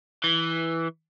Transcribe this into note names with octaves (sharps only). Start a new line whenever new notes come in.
E3